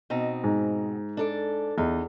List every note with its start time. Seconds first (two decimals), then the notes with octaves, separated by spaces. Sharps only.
0.10 B2 C4 D#4
0.44 G#2
1.17 D4 A4 D5
1.78 E2 D#4